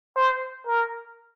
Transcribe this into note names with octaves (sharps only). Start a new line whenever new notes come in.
C5
A#4